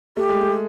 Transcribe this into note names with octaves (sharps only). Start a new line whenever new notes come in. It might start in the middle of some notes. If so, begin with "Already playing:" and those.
A3 G4
G#3
A3